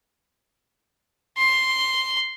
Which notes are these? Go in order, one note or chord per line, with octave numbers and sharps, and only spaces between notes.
C6